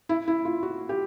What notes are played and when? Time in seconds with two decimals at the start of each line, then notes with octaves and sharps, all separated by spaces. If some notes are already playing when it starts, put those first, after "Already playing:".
0.09 E4
0.28 E4
0.45 F4
0.63 F#4
0.89 G4